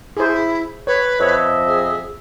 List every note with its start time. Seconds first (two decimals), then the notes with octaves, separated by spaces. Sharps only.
0.17 E4 G#4 C5
0.87 B4 C#5
1.20 F2 C#5 D#5 E5
1.67 G#4